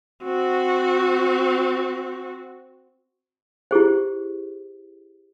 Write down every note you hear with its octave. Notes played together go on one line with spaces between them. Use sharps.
C4 F#4
E4 G4 G#4 C5